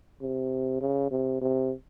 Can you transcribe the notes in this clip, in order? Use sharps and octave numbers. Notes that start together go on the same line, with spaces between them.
C3
C#3
C3
C3